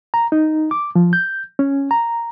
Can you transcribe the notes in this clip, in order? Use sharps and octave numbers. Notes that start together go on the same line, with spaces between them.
A#5
D#4
D6
F3
G6
C#4
A#5